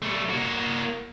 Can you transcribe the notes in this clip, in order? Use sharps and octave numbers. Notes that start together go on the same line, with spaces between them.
G3 A3
A#3 F#4